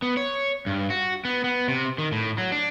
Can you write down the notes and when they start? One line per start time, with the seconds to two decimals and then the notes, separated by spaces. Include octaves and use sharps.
0.02 B3
0.17 C#5
0.66 G2
0.90 F#4
1.25 B3
1.44 B3
1.68 C3
1.98 D#3
2.12 A2
2.38 F#3
2.52 D4